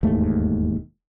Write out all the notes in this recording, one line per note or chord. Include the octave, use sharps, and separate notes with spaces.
E1 D#2 G#2 A3